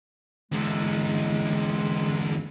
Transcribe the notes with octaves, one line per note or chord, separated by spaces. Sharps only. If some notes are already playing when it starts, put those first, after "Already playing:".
E2 D3 G#3